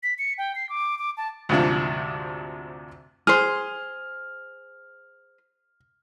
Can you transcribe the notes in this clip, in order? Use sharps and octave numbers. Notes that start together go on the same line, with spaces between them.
B6
C#7
G5
C7
D6
D6
A5
D2 G#2 C3 F3 D4
G#4 C5 F6